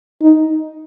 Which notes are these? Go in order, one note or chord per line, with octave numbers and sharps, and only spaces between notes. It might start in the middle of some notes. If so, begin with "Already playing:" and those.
D#4